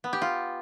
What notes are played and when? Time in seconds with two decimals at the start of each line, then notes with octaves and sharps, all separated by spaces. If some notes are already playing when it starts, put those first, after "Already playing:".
0.04 B3
0.13 G4
0.22 F4